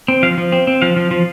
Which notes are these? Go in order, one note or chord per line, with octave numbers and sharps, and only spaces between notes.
C4
F3 F5
F3
C4
C4
F3 F5
F3
F3